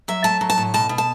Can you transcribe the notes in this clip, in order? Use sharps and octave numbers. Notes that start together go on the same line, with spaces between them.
F#3 E5
A3 A5
F#3
A5
A2
B2 A5
B2
A5